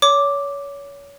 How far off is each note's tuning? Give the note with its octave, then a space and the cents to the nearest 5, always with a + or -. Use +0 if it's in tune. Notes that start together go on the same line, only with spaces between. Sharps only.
C#5 +30 D6 +0